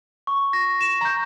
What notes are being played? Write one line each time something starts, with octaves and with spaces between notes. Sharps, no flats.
C#6
A#6
E7
A#5 G6